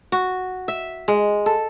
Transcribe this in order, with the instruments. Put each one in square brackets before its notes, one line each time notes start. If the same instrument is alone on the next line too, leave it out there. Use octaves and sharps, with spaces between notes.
[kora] F#4
E5
G#3
A4